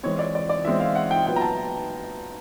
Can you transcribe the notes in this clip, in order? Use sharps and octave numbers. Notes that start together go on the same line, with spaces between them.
E3 G#3 C4 C#5
D5
D5
D5
E3 G#3 C4 E5
F5
F#5
G5
A#2 F#3 B3 G5
A#5
A5